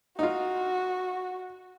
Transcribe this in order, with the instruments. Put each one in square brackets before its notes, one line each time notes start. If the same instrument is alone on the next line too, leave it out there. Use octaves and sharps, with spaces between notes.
[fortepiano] D#4 F4 [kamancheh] F#4